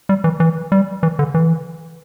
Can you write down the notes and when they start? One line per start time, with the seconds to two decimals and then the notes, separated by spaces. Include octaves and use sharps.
0.09 G3
0.24 E3
0.40 E3
0.72 G3
1.03 E3
1.19 D3
1.34 E3